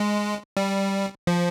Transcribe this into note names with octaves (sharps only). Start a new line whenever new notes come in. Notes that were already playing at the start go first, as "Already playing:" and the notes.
Already playing: G#3
G3
F3